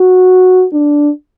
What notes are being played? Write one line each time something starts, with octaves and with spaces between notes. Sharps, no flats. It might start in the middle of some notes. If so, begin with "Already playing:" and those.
Already playing: F#4
D4